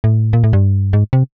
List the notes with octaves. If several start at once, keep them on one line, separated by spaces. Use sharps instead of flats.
A2
A#2
A2
G2
G#2
C3